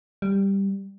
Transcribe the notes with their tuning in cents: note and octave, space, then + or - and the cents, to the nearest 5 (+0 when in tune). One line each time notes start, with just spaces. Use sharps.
G3 +5